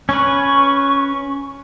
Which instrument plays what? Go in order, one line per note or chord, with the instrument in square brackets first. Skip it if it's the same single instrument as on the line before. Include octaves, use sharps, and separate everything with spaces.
[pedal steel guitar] C#4 B4 [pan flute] C#6